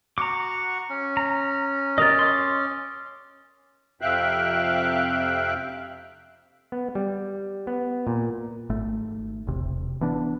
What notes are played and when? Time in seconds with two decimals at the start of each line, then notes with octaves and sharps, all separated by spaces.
0.18 F#4 F#5 A#5 C#6 D6
0.90 C#4
1.17 A#5
1.98 G4 A#4 D#5 D#6 A6
2.19 C6 D6
4.01 F2 C3 E5 F5 G5 F#6
6.72 B3
6.95 G3
7.67 B3
8.07 A#2
8.70 G#1 A3
9.47 E1 C3
10.01 E3 B3 D4